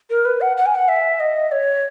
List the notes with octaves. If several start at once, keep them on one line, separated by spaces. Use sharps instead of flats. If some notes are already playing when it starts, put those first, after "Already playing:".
A#4
B4
F#5
F#5
G#5
F#5
E5
D#5
C#5